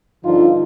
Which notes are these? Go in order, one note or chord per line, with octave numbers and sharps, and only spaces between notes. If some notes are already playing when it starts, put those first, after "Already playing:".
G2 D3 F3 D#4 F4